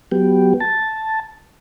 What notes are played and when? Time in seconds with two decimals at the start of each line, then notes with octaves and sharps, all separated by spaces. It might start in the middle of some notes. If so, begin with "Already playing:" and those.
0.11 F#3 B3 G4
0.60 A5